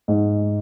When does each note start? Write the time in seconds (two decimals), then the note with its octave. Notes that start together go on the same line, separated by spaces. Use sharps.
0.08 G#2